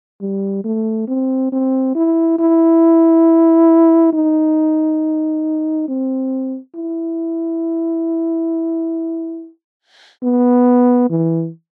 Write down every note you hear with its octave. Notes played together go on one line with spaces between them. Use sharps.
G3
A3
C4
C4
E4
E4
D#4
C4
E4
B3
E3